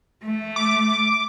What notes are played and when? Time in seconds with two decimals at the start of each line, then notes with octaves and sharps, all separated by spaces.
0.24 A3
0.56 D6